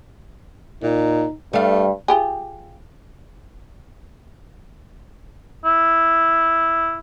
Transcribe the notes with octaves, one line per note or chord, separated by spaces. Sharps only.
A#2 D#4
G2 G3 A3 F5
F4 G4 G#4
E4